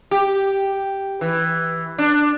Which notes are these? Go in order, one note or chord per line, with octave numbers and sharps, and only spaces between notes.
G4
E3
D4